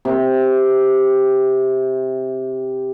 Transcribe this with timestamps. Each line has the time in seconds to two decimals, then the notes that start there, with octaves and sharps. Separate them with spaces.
0.05 C3 C4